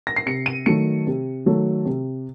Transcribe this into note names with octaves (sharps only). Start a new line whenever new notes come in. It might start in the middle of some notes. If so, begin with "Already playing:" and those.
A#6
C7
C3 C#7
D#7
D#3 F#3 A3 C#7
C3
D#3 F#3 A3
C3